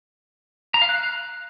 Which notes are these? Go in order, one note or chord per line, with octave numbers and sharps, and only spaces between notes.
A#5
F5
F#6